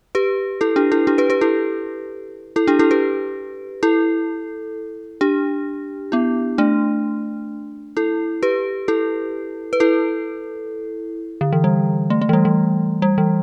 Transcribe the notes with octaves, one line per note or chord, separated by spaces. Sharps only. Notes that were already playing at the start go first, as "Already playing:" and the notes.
G4 B4
E4 A4
D4 G4
E4 A4
D4 G4
G4 B4
G4 B4
E4 A4
E4 A4
D4 G4
E4 A4
G4 B4
E4 A4
D4 G4
B3 E4
A3 D4
E4 A4
G4 B4
E4 A4
B4
E4 A4
D3
E3
G3
A3
A3
E3
G3
E3
G3
E3